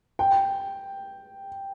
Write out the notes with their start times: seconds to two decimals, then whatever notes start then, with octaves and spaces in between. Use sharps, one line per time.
0.19 G5